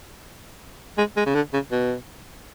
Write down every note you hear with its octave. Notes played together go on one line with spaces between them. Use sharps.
G#3
G#3
C#3
D3
C#3
B2